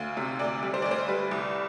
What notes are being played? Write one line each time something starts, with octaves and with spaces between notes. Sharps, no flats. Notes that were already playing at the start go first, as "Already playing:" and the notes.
Already playing: D2 F5
C3
D2 D5
G3
C5
D5
D2
C5
G3 B4
C2